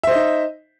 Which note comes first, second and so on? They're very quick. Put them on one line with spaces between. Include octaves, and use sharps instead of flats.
E5 C5 D#5 D#4